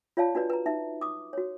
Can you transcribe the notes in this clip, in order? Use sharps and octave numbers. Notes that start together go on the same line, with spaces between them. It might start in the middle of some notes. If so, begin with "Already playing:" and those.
F4 C#5 D5 F5 A5
D4 F#4 B4 D5
B4 A#5
D#4 E5
D6 D#6
F#4 C#5